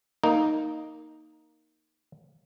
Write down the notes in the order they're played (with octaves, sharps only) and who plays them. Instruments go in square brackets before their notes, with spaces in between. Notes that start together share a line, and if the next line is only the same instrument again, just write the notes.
[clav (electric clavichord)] A#3 D#4